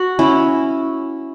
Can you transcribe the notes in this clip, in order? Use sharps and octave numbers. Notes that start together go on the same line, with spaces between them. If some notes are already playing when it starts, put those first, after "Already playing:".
Already playing: F#4
C#4 E4